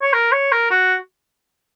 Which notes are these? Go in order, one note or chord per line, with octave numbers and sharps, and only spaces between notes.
C#5
A#4
C#5
A#4
F#4